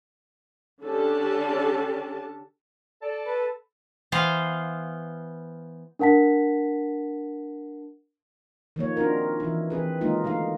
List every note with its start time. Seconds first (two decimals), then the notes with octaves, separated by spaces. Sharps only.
0.82 D3 C#4 D4 G4 A4 A5
3.02 A4 D5 A5
3.26 B4
4.12 E3 B3 C5 F5
5.99 D4 A#4 F#5 A5 B6
8.76 D#3 F3 A#3 C#5
8.97 C4 D4 D#4 F4 F#4 A#4
9.40 E3 E4
9.70 E3 C4 G#4 B4
10.01 D#3 F#3 G#3 A#3 D#4 F4
10.24 D3 A3 D#4 F5